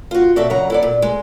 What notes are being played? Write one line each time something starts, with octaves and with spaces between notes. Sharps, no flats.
F4 F#4
A#2 F#4 A4 D5 E5
C#3 F#3 F#5 A#5
E4 A4 D5
A#2
G#3